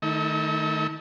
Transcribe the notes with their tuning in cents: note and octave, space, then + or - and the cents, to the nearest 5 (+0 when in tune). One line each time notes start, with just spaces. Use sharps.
D#3 +0 A3 +0 E4 -40